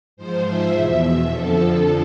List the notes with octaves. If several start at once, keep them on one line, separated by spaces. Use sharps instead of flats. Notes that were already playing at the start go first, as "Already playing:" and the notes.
G#2 F3 C5
E5
E2 B2
F2 D3 F3 A4
A4